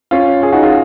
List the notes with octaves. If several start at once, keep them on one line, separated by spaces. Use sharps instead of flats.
C#4 F4
F4 G#4
D#4 F#4
F4 G#4